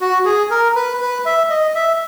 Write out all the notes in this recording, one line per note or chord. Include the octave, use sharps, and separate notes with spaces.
F#4
G#4
A#4
B4
B4
E5
D#5
E5